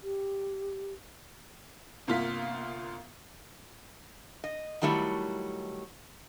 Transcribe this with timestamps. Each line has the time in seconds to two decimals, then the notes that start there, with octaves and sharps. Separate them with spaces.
0.03 G4
2.07 G1 C2 A#3 F4 F5 B6
4.44 D#5
4.82 D#3 F#3 G3 A3 E4